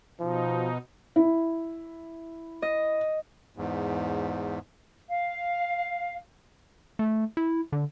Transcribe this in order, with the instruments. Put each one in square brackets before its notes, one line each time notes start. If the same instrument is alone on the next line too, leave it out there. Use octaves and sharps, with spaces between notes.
[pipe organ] B2 D#4 [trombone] F3
[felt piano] E4
[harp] D#5
[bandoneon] E2 G#2
[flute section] F5
[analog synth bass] A3
E4
D3